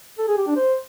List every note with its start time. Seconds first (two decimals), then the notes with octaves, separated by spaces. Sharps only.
0.18 A4
0.28 G#4
0.37 G4
0.47 D4
0.56 C5